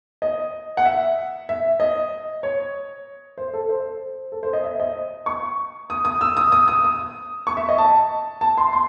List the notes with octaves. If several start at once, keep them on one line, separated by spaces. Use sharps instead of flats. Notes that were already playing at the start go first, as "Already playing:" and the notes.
D#5
F#5
E5
E5
D#5
C#5
C5
A4
C5
A4
C5
D#5
E5
D#5
C#6
D#6
D#6
E6
D#6
D#6
D#6
D#6
C#6
E5
D#5
A5
A5
C6
C6